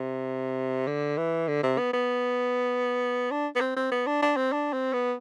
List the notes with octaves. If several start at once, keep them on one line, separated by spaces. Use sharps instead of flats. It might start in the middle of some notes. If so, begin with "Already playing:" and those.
Already playing: C3
D3
E3
D3
C3
B3
B3
D4
B3
C4
C4
B3
D4
D4
C4
D4
C4
B3